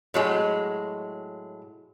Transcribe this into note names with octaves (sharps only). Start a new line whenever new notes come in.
A2 F#3 G#3